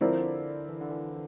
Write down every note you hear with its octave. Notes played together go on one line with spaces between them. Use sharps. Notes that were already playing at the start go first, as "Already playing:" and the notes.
D3 F3 C4 E4 A#4 D5
D3
E3
D3
E3